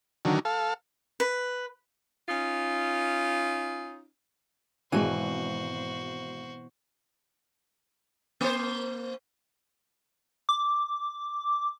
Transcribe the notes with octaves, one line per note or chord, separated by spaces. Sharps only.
D3 D#3 F#3
A4 F5
B4
C#4 D#4 F4
G#1 B2 E3 G#3 F#4 C5 D#7
A#3 C5
D6